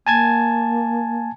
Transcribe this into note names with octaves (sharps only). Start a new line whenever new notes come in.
A#3 G#5 A5 G#6